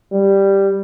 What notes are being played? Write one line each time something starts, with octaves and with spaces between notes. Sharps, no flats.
G3